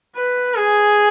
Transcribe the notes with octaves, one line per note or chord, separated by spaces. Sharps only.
B4
G#4